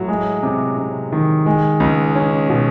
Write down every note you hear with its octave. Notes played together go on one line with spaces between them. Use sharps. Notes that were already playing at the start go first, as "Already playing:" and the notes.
Already playing: A2 F#3
G#3
C3
C3
D#3
G#3
C#2
C#4
B2